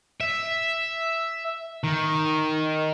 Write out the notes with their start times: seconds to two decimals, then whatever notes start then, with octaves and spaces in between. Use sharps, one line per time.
0.20 E5
1.84 D#3